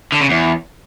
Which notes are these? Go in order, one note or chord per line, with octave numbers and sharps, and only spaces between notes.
D3
C#3
E2